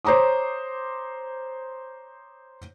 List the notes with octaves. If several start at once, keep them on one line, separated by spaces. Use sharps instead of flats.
C5 C#5 A#5 D6 D#6